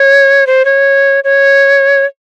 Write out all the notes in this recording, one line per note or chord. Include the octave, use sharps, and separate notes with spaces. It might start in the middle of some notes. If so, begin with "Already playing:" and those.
Already playing: C#5
C5
C#5
C#5